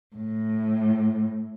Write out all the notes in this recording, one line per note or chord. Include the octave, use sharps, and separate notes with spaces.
A2